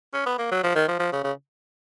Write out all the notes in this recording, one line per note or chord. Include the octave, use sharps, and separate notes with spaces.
C#4
B3
A#3
F#3
F3
D#3
F3
F3
C#3
C#3